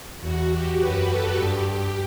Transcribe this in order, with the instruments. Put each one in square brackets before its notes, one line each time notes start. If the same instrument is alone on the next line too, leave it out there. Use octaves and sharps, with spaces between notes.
[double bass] E2 [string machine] F#4
[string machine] G4
[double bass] F#2 [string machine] B4
[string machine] A4
[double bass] G2 [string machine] G4